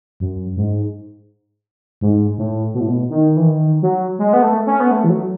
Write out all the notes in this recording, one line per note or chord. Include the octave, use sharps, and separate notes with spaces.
F#2
G#2
G#2
A2
B2
A2
B2
D#3
E3
D#3
F#3
G#3
B3
A3
C#4
B3
A3
E3
F#3